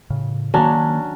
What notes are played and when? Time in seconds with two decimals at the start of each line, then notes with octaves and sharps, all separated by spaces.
0.10 A2 C#3
0.54 D#3 F#3 A#3 C#4 D4